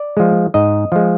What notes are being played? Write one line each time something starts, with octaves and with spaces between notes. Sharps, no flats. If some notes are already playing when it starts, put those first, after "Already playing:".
Already playing: D5
F3 G#3
G#2 D#5
F3 G#3